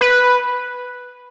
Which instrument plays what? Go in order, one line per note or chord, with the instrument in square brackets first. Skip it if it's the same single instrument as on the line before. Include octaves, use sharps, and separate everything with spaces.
[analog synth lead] B4